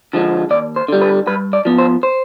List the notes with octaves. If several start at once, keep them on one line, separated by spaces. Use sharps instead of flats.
D3 F3 G#3
D#2 D5
C5
D3 G3
B4
G2 B4
D5
F3 B3
C5
C5